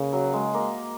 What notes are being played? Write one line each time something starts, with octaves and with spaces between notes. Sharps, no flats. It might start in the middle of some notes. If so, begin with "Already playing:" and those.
Already playing: C#3 A#3
F#3
G#3
A#3